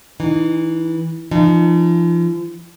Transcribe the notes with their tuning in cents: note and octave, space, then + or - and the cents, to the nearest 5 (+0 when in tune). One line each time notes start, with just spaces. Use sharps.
E3 -10 D#4 -30
F3 -40 D#4 -40